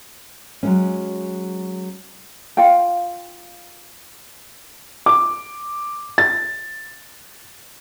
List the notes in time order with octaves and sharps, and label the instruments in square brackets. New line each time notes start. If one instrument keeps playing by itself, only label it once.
[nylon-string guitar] F#3 G#3 C#4
[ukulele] F4 F5 G5
[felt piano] D6
A6